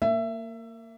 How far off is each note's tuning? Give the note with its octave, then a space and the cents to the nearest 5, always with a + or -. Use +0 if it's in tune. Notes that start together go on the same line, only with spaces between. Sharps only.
A#3 -20 E5 +20